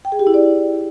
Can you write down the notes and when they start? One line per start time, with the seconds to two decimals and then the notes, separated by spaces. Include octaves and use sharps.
0.05 G5
0.12 G#4
0.19 G4
0.27 E4
0.34 D5